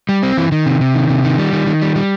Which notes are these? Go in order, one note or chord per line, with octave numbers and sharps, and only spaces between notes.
G3
C4
E3
D#3
C3
C3
D#3
C3
D#3
G3
D#3
D#3
G3
G3